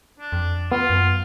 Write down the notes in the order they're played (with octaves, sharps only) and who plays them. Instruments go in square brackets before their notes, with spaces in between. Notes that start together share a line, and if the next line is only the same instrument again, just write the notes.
[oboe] D4
[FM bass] F2
[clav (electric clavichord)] B3 [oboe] F4
[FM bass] F#2